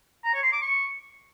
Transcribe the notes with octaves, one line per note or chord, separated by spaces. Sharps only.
A#5
C#5
C6
D6
C#6